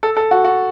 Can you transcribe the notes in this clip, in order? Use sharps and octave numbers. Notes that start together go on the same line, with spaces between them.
A4
A4
F#4
F#4